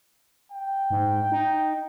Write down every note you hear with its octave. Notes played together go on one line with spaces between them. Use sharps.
G5
G#2
D#4